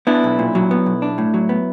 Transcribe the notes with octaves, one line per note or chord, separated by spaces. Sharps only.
B3 D4 E4
B1
A#2
F#3
B3
B1
D4
A2
F#3
B3